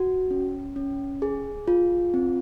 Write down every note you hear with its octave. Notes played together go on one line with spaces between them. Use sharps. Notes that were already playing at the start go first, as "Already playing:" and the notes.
Already playing: F#4
C#4
C#4
G#4
F4
C4